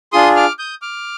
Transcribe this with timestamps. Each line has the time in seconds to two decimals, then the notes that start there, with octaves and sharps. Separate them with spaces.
0.13 D4 F4 G#4 C6 D#6
0.36 D6 F6
0.59 D#6 G6
0.82 D6 F6